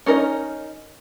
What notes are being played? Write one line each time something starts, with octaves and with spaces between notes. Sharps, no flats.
C#4 D#4 A#4 C#5 D#5